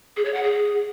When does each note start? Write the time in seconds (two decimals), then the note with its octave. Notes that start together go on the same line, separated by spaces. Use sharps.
0.16 G#4
0.25 C#5
0.34 F#5
0.43 G#4